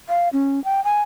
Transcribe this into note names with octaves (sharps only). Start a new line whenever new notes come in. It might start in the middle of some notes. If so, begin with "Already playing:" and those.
F5
C#4
G5
G#5